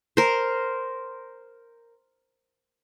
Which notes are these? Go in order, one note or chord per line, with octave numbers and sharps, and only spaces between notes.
A#4 C5